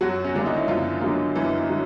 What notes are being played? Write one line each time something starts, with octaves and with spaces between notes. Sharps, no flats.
F#2 F#3 F#4
C#4
D3 F#3 A#3 D4
D#4
E4
F#2 F3 F4
D3 F#3 A#3
F#2 E3 E4
D3 F#3